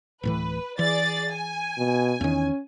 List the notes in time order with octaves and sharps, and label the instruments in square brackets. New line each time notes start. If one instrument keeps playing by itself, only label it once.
[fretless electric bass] D1 A2 E3 [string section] B4
[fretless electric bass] E3 [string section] G#4 D5 A6
[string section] G#5
[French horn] B2
[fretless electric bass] E2 D#3 [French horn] C#4